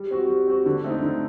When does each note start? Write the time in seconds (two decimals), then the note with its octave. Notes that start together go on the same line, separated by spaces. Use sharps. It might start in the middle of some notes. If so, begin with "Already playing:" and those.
Already playing: G3
0.11 C4 F#4
0.29 G3
0.47 C4 F#4
0.66 D3
0.84 A3 C4 D#4
1.02 D3